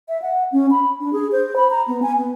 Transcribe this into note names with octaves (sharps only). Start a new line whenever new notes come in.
E5
F#5
C#4
B5
D4
G#4
C5
B5
A#5
B3
G#5
B3